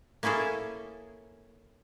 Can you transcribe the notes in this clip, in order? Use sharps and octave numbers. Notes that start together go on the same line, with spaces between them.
A#3 C#4 E4 G#4 A4